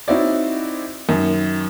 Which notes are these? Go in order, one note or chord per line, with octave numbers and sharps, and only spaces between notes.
C4 D#4 E4 F#4 C#5 D5
F#2 D#3